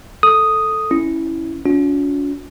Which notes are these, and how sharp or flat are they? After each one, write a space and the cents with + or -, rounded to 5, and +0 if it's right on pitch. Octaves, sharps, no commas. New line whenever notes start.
A4 +0 D#6 +0
C#4 +0 E4 -5
C#4 +45 F4 +45